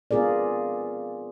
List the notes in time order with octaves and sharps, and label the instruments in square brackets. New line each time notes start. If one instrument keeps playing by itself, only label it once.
[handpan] B3 C4 F4 G#4 A#4 D5